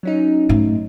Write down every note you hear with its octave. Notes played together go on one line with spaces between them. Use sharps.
F#3 C#4 D#4
G#2 A3